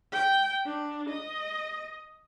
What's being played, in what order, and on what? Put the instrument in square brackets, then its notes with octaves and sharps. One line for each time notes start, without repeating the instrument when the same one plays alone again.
[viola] G5
D4
D#5